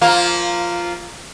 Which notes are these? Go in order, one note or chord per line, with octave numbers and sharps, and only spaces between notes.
F3 A#3 F4